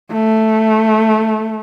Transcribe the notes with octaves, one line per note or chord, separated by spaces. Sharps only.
A3